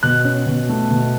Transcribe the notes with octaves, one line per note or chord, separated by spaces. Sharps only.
B2 F#6
C#4
B2
A3
B2